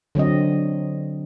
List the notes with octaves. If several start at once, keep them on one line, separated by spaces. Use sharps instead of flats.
D3 F#3 C4 D#5